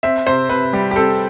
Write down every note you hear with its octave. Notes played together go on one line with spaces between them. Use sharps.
C4 E5
C3 C5
C3 B4
G3 G4
G4
C4 A4